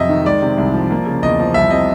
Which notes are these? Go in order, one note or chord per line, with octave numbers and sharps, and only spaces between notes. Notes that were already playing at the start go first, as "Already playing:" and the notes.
Already playing: F2 C3 F#3 D#5 E5
D#3
G#3 D5
C3
C2
F3
A#3
C#3
E2 D#5
F3
C2 E5
C3 D#5